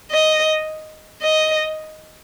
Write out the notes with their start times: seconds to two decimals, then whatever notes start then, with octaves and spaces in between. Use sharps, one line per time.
0.11 D#5
1.22 D#5